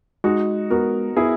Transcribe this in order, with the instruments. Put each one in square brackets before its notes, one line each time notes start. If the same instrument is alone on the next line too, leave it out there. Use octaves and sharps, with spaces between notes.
[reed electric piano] G#3 [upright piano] D#4 F#4
[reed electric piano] B3 [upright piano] F#4 A#4
[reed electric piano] B3 [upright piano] E4 G#4